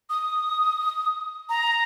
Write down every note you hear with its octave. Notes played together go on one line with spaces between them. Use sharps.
D#6
A#5